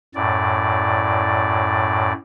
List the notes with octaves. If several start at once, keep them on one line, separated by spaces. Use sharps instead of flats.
F#2 A2 D5